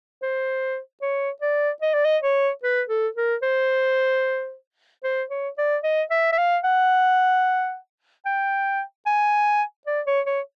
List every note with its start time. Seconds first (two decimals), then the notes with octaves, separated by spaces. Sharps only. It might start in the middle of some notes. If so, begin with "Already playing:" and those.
0.22 C5
1.02 C#5
1.42 D5
1.82 D#5
1.94 D5
2.05 D#5
2.22 C#5
2.63 B4
2.89 A4
3.16 A#4
3.43 C5
5.04 C5
5.30 C#5
5.58 D5
5.84 D#5
6.11 E5
6.32 E5
6.38 F5
6.64 F#5
8.25 G5
9.06 G#5
9.87 D5
10.07 C#5
10.26 C#5